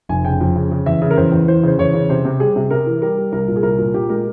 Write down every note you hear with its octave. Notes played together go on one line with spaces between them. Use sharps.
F1 G#5
C#3 G5
F2
C#3
C#3
E2 E5
C#3
A#4
E2 C5
E2
E3 C5
C#3 C5
E2 C#5
C#3
C3 C5
C3
G3 G#4
C3
C3 A#4
E3
G3 A#4
G3
C2 A#4
A#2
G#4
C2 A#4
A#2
A#2 G4
G#3 A#4